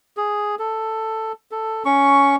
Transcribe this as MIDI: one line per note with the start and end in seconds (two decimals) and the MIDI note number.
0.17 0.55 68
0.59 1.32 69
1.51 1.83 69
1.85 2.36 61
1.85 2.36 85